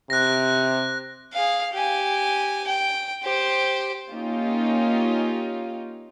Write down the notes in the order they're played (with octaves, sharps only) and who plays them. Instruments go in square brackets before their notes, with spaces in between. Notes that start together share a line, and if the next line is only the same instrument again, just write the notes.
[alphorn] C3 [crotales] F#6 A#6
[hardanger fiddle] G#4 F5
G4 G#5
G5
G4 C5
[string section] A#3 C#4 D#4 F4 G4